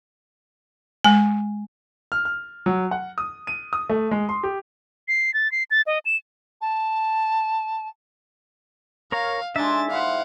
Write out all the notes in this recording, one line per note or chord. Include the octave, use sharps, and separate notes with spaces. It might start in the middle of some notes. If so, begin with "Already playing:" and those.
G#3 G#5
F6
F6
F#3
F#5
D#6
D#7
D#6
A3
G#3
C6
G4
C7
A6
C7
A6
D#5
E7
A5
A#4 C#5 F5 A#5
G#3 D4 D#4 E5 G#5 A6
E4 C5 F5 F#5